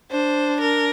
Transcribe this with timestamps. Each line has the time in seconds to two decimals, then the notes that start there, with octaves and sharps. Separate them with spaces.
0.11 D4 C5
0.61 A#4